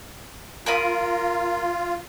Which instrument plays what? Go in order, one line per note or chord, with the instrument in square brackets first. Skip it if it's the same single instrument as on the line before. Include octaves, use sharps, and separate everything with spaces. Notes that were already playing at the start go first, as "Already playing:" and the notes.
[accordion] F4 [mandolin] A#4 B5 D#6